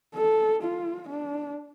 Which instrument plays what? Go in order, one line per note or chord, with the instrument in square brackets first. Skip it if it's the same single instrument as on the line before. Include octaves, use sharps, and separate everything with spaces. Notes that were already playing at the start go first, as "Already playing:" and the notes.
[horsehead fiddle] A4
F4
D4